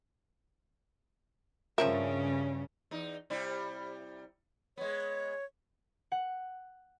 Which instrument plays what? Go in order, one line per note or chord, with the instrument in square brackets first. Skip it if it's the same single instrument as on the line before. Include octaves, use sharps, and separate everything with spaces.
[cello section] G2 C#3 [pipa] F3 C4 E5 [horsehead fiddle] C#4 [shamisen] A#4
[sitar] E2 D#4
C3 G3 E4
[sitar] G#3 B3 [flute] C#5
[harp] F#5